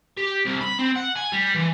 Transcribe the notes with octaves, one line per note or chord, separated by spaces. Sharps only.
G4
C2
B5
C4
F#5
G#5
G3
E3